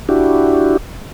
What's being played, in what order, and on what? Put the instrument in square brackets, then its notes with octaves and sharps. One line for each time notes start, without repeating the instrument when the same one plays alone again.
[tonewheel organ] D4 E4 F#4 G4